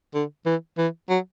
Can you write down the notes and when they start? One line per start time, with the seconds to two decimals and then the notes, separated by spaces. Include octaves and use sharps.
0.15 D3
0.46 E3
0.78 E3
1.09 F#3